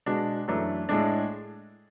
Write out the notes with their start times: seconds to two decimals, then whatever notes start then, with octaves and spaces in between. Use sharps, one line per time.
0.06 B2 G#3 D4
0.48 F#2 E3 A3 D4
0.89 A2 G#3 D4